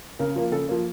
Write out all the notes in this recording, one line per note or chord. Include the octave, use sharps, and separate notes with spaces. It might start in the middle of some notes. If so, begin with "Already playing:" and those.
C#3 A#4
F3 A#3
C#3 A4
F3 A#3